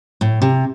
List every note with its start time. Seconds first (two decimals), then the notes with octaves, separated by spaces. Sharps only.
0.21 A2
0.42 C3